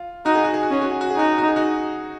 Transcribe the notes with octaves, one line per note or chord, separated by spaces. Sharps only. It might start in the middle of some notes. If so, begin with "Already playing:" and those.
Already playing: F4
D#4 F#4
G#4
F#4
G#4
F#4
C#4 G#4
F#4
G#4
F#4
G#4
D#4 F#4
G#4
F#4
G#4
D#4 F#4